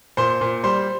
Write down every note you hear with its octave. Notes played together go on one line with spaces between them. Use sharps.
A#2 C5 C6
A#2
G3 C5 C6